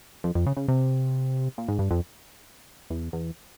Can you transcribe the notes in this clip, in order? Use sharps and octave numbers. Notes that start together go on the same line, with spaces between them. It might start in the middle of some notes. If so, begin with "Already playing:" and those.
F2
F2
C#3
C#3
C3
A#2
G#2
G2
F2
E2
E2